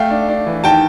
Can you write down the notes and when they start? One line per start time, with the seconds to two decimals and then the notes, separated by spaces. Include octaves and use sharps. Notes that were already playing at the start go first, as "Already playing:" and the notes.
Already playing: A3 F5 G5
0.10 D4
0.29 D4
0.46 E3
0.64 D#3 G5 A5